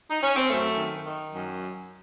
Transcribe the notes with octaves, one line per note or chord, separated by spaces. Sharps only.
D#4
C#4
C4
F#2 A3
D#3
D#3
F#2